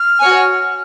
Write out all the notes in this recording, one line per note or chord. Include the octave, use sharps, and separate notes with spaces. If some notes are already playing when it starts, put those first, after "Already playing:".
Already playing: F6
F#4 C#5 G#5